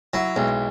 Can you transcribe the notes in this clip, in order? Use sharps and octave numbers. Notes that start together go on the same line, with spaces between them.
F#3 E4
B1 G#3